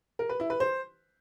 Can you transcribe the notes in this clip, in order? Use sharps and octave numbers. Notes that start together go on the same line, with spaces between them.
A#4
B4
E4
B4
C5